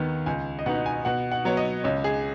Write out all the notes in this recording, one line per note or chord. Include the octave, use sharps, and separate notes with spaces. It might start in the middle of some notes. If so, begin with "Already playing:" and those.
Already playing: D#2 D#3 B3
C#2 G#5
D#5
B2 B3 D#4 F#5
G#5
B2 F#5
F#5
F#3 B3 C#5
D#5
C#2 C#5
G#4